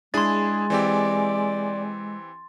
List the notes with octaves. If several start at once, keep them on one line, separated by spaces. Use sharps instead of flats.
G#3 D4 E4 G#4 C6 A6
E3 C4 G4 D5